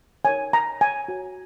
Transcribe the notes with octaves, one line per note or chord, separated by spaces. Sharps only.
D#4 A#4 C#5 G#5
A#5
G#5
F#4 C#5